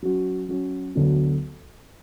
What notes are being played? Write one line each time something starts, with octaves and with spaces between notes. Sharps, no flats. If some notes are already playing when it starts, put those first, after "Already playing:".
F#3 C#4 F#4
F#3 C#4 F#4
D2 D3 F#3 B3